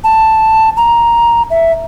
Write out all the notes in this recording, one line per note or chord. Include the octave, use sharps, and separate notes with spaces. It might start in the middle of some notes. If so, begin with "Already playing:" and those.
A5
A#5
E5